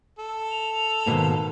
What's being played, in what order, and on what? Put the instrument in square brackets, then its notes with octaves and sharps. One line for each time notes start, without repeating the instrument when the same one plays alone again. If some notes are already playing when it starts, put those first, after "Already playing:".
[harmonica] A4
[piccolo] F7
[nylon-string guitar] G#2 B2 A#3 [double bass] D#3